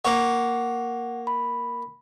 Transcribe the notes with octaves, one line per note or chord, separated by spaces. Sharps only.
A#3 C#5 F#5
B5